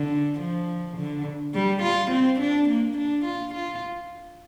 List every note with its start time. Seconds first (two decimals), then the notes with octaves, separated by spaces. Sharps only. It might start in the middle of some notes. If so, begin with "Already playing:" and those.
Already playing: D3
0.40 F3
0.98 D3
1.54 G3
1.83 F4
2.11 C4
2.40 D4
2.69 A#3
2.98 D4
3.25 F4
3.54 F4